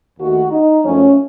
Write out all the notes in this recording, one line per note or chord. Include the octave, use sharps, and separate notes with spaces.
D#2 D#3 A3 F#4
D#4
F#2 F3 A3 C#4